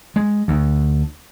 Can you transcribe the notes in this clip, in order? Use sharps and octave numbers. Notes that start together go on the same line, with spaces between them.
G#3
D2